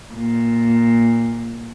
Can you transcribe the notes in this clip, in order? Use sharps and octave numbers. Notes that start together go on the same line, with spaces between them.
A#2